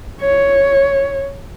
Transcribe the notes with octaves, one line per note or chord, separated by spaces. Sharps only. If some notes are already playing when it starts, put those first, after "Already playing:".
C#5